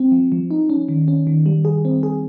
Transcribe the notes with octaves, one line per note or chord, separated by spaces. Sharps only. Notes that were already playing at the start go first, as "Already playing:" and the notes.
Already playing: C4
F3
F3
D#4
C#4
D#3
C#4
D#3
G3
G#4
C4
G#4